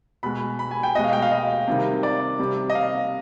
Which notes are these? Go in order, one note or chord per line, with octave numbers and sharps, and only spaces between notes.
B2 G#3 B5
B5
G#5
G5
B2 G#3 D#5
F5
G5
F5
D#5
C3 D#3 G3
D5
C3 G3
D#5
F5